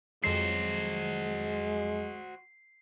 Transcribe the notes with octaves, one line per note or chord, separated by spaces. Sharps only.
F2 F#3 G#3 F#4 C5 C7